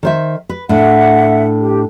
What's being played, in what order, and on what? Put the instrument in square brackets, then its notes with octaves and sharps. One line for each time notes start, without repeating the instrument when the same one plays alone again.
[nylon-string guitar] D#3 C5 E5
B4
[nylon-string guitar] A2 D4 [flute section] E5 F#5
[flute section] G4